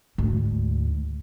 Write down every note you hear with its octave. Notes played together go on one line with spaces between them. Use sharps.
D2 G#2